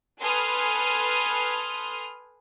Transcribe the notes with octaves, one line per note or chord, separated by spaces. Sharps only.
A4 B4 G#5 C6 D#6 F6